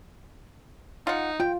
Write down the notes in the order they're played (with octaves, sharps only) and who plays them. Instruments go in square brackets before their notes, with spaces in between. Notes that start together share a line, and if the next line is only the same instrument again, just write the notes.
[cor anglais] D#4 [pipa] F4 F#5
[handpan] F4 [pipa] G5